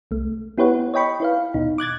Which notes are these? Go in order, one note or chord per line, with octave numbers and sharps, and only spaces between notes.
C2 A3
B3 E4 G4 B4 C#5 F#5
C#5 D#5 G5 B5 C#6
E4 B4 F5
D#2 B2 D#4
D6 F#6 G#6 A6